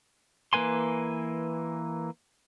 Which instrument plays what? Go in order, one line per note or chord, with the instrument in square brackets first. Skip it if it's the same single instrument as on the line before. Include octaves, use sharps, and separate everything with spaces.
[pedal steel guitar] E3 A#3 B4 G#5 C6